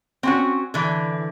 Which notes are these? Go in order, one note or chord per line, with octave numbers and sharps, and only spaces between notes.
C4 C#4 F#4
D3 E3